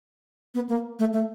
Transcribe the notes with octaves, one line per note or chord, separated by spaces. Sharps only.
B3
A#3
A3
A3